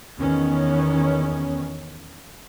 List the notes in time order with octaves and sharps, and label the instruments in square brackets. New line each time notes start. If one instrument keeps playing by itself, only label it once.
[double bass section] E2 D#3 B3 C#4